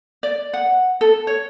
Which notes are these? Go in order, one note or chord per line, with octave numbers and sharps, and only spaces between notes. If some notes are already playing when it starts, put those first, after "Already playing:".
D5
F#5
A4
C#5